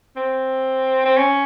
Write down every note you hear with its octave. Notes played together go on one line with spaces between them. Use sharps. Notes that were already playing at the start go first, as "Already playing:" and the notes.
C4
C4
C#4